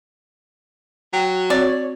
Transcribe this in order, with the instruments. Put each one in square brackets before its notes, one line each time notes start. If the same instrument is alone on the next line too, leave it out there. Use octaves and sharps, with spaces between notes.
[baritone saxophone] F#3 [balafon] G5
[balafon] C4 F#4 [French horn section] C#5 [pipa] D5